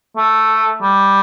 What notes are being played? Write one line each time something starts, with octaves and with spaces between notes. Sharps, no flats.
A3
G3